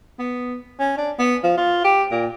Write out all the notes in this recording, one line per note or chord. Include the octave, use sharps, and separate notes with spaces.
B3
C#4
D4
B3
F3
F4
G4
A#2